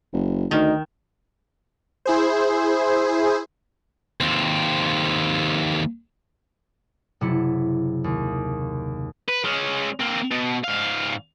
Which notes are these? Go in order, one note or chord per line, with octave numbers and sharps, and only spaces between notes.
F#1
D2 D#3 D#4
E4 G#4 C5
D#2 C4
F#1 C3 A3 E4 C#7
D#2
B4
G#3 C#4
A#3 C4
B2
G#2 F5